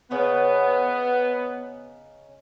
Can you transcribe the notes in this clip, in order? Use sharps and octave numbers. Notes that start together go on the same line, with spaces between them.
C#3 B3 C#4 D#4